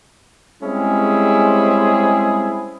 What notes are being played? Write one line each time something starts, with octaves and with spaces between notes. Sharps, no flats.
G3 G#3 C4 C#4 E4 G#4